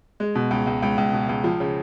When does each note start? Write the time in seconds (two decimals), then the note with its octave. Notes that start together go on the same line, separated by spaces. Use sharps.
0.20 G#3
0.35 B2
0.51 C#2
0.67 C#2
0.82 C#2
0.98 C#2
1.13 B2
1.29 C#2
1.44 F3
1.60 C#3